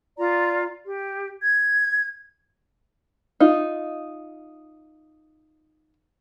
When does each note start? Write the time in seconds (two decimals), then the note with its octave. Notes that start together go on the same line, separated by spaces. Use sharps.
0.18 F4 D5 A#5
0.87 G4
1.41 G#6
3.40 D#4 F4